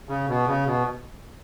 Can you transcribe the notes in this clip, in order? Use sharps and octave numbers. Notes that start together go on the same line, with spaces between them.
C#3
B2
C#3
B2